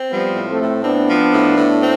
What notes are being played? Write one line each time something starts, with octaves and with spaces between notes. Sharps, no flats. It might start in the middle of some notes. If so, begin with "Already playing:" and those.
Already playing: C4
F3 G3 B3
A2
A3 C4
A2
B3 C4 D4
F3
A2
A2
C4